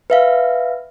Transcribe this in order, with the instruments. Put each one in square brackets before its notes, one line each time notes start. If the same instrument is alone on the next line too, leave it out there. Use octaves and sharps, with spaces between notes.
[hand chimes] B4 E5 F5